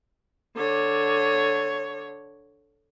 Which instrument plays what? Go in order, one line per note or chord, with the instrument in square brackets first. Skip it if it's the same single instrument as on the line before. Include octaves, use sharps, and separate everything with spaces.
[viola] D3 C#5